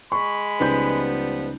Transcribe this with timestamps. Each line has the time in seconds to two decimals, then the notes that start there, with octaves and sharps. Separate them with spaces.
0.12 G#3 B5 C#6
0.60 C#2 F3 G3 B3 D#4 G6